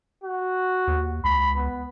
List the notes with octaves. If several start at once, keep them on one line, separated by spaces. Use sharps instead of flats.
F#4
D#2
C#2 B5
B3